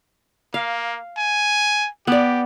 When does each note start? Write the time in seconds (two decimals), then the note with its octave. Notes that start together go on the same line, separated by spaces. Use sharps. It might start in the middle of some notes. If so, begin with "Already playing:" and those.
0.54 A#3 F5
1.18 G#5
2.07 B3 G4 D5